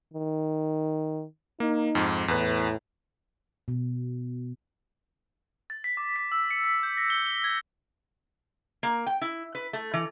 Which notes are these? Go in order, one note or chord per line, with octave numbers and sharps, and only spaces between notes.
D#3
A#3 D#4
F2 G#2
E2 A2 B4
B2
A6
B6
D6
B6
E6
C#7
B6
G6
A#6
G7
G7
G#6
A#3
G5
E4
B4
A3
E3